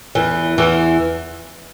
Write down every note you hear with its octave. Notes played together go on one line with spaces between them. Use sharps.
E2 E3
E2 E3